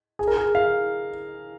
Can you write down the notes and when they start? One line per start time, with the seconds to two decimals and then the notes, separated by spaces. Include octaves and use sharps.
0.19 G#4
0.28 A#4
0.37 G#4
0.55 F5